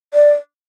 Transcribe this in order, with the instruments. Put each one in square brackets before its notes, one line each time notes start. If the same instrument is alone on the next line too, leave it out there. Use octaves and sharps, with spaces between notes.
[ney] D5